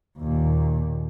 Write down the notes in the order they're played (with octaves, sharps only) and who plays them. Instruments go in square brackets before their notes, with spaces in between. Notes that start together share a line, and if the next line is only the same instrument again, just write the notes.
[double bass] D#2 A#2